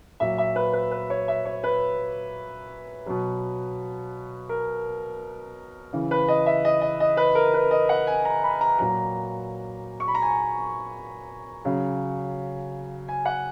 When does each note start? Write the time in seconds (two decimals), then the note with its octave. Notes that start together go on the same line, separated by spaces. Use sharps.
0.20 A#2 F#3 E5
0.38 E5
0.56 B4
0.73 B4
0.91 B4
1.10 C#5
1.28 E5
1.45 C#5
1.64 B4
3.06 B2 F#3
4.49 A#4
5.93 C#3 E3
6.11 B4
6.28 D#5
6.46 E5
6.65 D#5
6.81 D#5
7.00 D#5
7.17 B4
7.35 A#4
7.54 B4
7.71 D#5
7.89 F#5
8.07 G#5
8.25 A#5
8.44 B5
8.61 A#5
8.79 A#2 F#3 A#5
10.00 C#6
10.08 B5
10.15 A#5
10.22 G#5
11.65 C#3 F#3
13.08 G#5
13.25 F#5